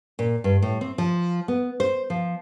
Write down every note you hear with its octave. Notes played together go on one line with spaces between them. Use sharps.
A#2
G2
A2
C4
F3
B3
C5
F3